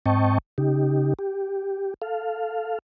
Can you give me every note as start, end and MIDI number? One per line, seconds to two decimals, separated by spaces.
0.06 0.38 44
0.06 0.38 60
0.06 0.38 75
0.06 0.38 79
0.06 0.38 81
0.06 0.38 85
0.58 1.14 49
0.58 1.14 63
0.58 1.14 67
1.19 1.94 67
2.02 2.79 69
2.02 2.79 77